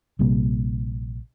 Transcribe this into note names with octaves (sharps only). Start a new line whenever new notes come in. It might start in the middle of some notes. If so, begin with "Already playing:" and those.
A#1 C3 G3 A#3